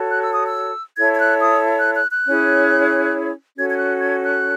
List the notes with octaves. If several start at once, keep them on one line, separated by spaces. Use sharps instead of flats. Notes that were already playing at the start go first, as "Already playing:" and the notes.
Already playing: F#4 A4 C#5
F#6
E6
D#6
E6
E4 A4 C#5 G#6
G#6
F#6
D#6
F#6
F#6
F#6
C#4 E4 G#4 C#5
C#4 F#4 A4 G#6
G#6
F#6
G#6
F#6